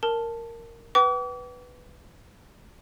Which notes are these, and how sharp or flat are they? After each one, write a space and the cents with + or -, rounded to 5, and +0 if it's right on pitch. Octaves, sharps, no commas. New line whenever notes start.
A#4 -10 A5 +0
B4 +0 G5 -45 D6 -40